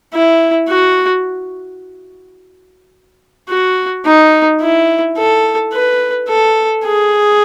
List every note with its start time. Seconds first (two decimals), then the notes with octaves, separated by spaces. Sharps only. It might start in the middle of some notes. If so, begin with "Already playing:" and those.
0.14 E4
0.69 F#4
3.49 F#4
4.05 D#4
4.61 E4
5.17 A4
5.73 B4
6.28 A4
6.85 G#4